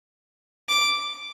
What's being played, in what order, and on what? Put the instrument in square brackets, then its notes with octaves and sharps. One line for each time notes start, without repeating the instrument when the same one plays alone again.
[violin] D6